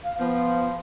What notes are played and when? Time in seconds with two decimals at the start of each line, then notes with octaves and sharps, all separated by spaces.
0.04 F5
0.19 F3 B3